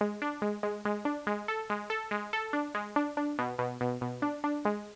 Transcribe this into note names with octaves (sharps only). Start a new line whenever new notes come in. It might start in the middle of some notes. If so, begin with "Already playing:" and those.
G#3
D4
G#3
G#3
G#3
D4
G#3
A4
G#3
A4
G#3
A4
D4
G#3
D4
D4
B2
B2
B2
B2
D4
D4
G#3